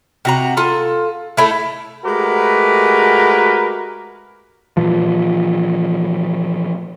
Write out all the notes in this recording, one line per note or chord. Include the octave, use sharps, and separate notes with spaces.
C3 F#4 A#5
F4 A4
A3 E4 A4
G#3 A3 F#4 G4 A#4 B4
A#2 E3 F3